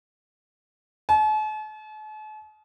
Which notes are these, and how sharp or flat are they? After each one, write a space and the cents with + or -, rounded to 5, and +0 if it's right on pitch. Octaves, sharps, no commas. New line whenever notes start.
A5 -45